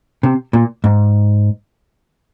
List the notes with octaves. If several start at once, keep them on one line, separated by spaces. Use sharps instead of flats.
C3
A#2
G#2